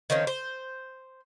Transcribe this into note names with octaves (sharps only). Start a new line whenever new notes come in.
D#3 F3 C4 C#4
C5